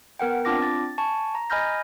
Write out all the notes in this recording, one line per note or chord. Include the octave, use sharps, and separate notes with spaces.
B3 A#4 F#5 G5
C4 D4 F4 D6 A#6
A6
G#5 A5 C#6
A#5
D#5 G#5 B5 F6 G6 A#6